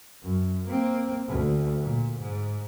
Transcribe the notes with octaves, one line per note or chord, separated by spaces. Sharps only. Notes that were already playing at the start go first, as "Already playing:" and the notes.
F#2
A#3 C4
D2
A#2
G#2